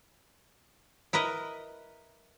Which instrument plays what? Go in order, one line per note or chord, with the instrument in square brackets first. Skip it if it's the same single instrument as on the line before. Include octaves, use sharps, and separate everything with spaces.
[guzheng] E4 A#4 B4 D#5